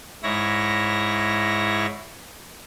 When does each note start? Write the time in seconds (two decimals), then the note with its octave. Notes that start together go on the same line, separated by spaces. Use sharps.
0.23 G#2 E4 C#5 A#6